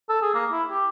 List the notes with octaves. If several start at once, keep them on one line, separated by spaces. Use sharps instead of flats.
A4
G#4
A#3
E4
G4